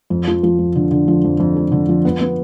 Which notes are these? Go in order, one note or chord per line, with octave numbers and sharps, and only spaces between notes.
F2
F3
F3
F2
D3
D3
F3
F2
F2
F3
D3
F3
B3
B3